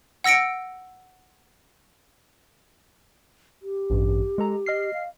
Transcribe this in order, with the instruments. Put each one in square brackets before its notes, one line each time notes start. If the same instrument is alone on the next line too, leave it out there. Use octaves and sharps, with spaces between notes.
[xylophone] F#5 E6 A#6 C#7 D7
[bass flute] G4
[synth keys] A1 G2
G#3 A4 A#5
D#5 F6 C7
[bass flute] F5